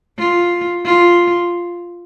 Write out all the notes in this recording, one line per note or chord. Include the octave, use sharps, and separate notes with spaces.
F4
F4